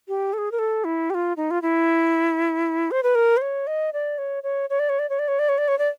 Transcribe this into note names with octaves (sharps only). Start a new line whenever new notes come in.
G4
A4
G#4
A#4
A4
E4
G4
F4
D#4
F4
E4
C5
B4
A#4
C5
C#5
D#5
D5
C#5
C#5
C#5
D5
C#5
D5
C#5
D5
C#5
D5
C#5
D5
C#5
D5